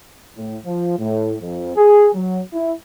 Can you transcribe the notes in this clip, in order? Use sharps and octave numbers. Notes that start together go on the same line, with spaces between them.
A2
F3
A2
F2
G#4
F#3
E4